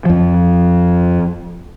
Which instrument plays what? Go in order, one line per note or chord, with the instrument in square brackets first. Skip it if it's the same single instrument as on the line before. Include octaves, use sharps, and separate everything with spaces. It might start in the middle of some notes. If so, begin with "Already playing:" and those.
[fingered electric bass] F2 F3